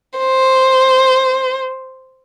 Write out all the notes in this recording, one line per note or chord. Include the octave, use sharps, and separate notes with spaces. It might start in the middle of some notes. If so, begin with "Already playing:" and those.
C5